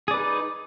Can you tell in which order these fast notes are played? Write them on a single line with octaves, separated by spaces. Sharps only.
G#4 D5 B4 D#4